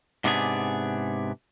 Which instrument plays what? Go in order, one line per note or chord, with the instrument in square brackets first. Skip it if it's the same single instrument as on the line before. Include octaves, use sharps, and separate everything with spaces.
[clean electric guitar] G#2 C3 B3 D4 G#4